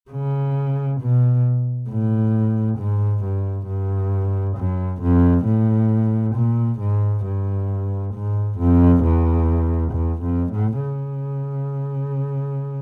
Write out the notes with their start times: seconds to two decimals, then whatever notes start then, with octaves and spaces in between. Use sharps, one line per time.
0.11 C#3
1.00 B2
1.89 A2
2.78 G#2
3.24 G2
3.67 G2
4.56 F#2
5.02 F2
5.46 A2
6.35 A#2
6.80 G#2
7.25 G2
8.14 G#2
8.59 F2
9.03 E2
9.92 E2
10.22 F2
10.52 A2
10.82 C#3